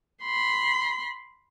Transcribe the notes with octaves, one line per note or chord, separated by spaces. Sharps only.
B5 C6